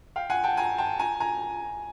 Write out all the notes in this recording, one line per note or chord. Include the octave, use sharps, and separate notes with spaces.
F5 G5
F#5 G#5
G5 A5
G#5 A#5
G5 A5
G#5 A#5
G#5 A#5